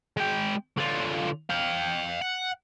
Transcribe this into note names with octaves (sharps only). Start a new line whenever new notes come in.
G#3 G5
D3 F4
F5 G5
F#5